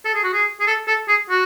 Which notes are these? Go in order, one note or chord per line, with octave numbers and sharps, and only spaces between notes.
A4
G#4
F#4
G#4
G#4
A4
A4
G#4
F#4